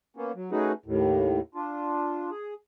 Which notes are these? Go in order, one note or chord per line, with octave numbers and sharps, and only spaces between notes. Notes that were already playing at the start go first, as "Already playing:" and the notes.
A#3 B3 C#4
F#3
A3 C#4 D#4 F#4 G#4 B4
D#2 A2
D4 F4
G#4